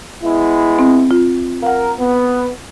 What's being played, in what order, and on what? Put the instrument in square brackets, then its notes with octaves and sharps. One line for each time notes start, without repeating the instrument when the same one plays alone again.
[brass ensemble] G#3 B3 E4
[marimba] C4
F4
[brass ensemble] A#4 [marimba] F5 F#5
[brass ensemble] B3